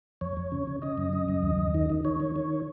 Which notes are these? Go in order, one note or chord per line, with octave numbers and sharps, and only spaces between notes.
F2 C#5
F2
C#3
C#3
C#3 D#5
F#2
C#3
F#2
D#2
D#2
D#3
D#3
D#3 C#5
D#3
D#3